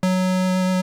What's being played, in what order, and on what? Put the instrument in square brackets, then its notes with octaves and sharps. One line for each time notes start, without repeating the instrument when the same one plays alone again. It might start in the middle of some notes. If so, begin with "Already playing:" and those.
[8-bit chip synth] F#3